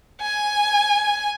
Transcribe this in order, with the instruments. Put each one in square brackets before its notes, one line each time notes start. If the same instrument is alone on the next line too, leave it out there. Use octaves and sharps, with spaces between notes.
[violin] G#5